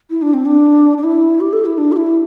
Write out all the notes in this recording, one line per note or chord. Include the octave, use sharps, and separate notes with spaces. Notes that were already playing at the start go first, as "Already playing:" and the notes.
E4
D4
C4
D4
D4
E4
G4
A4
E4
D4
G4
E4